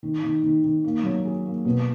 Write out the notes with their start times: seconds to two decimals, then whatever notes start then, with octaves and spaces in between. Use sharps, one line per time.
0.03 D#3
0.23 D#3
0.44 D#3
0.64 D#3
0.84 A#3
1.04 F#3
1.25 G#4
1.45 A#3
1.65 B2